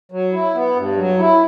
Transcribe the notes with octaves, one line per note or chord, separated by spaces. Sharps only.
F#3
E4
B3
G2
F#3
E4